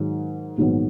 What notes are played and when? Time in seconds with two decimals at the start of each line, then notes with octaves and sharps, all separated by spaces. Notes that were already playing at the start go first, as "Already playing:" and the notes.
Already playing: G#2 D#3 F#3
0.58 A#1 G#2 D#3 F#3 B3